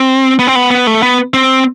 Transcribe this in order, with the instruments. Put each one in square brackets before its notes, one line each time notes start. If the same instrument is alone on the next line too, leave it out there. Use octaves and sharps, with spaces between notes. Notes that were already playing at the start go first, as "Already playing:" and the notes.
Already playing: [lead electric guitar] C4
B3
C4
B3
B3
A3
B3
C4